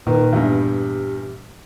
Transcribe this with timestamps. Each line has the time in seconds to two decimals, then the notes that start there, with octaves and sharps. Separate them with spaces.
0.07 A#2 D#3 B4
0.33 E2 G2 G4